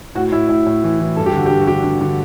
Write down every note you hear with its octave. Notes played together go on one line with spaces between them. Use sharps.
A2 F#4
A2 E4
A2 E4
A2
E3
E3
G2 A4
G4
D3 F#4
G4
G2
F#4
D3 G4
D3
D3